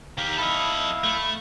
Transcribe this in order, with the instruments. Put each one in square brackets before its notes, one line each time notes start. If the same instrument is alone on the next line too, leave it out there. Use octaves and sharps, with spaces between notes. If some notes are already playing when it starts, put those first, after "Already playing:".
[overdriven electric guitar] D#3 G4 [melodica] F5
[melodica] E4 F5 [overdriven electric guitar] A4 D#5
[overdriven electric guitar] A3